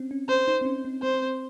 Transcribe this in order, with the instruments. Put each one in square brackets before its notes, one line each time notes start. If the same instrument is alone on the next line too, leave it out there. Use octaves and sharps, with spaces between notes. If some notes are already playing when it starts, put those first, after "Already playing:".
Already playing: [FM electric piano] C4 C#4
C#4
[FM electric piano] C#4 [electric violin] C5
[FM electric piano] D#4
C4
C#4
C4
[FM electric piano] C4 [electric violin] C5